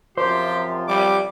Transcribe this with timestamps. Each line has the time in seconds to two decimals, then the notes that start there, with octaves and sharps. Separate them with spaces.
0.17 F#2 C3 F3 G4 C5
0.88 G3 D6